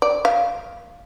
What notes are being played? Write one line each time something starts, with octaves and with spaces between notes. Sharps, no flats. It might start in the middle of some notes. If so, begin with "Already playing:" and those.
D5
F5